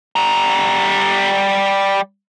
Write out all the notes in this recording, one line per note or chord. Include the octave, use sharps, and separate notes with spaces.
G3 A#5